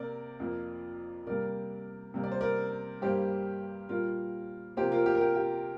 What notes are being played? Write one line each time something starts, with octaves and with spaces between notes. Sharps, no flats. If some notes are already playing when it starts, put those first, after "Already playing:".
Already playing: C3 A#3 A#4 D5
F2 F3 A#3
C3 G3 A#3 A#4 D5
C3 G3 A#3
D5
C5
A#4 D5
G2 G3 A#3 G4 C5
A#2 G3 A#3 F4 A#4
C3 F3 A#3 G4 C5
F4 A#4
G4
A#4
G4
G4